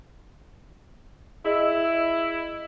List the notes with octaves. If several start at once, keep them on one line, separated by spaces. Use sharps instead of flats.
E4 G#4 D#5 E6